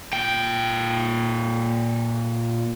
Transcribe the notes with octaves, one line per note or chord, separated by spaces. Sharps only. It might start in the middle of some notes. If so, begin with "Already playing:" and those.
A#2 G5